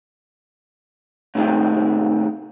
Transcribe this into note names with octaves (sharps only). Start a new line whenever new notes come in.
A2 C3 D#3 G#3 C4